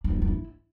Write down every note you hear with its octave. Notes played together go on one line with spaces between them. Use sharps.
D4
D#4
E4
D4
E4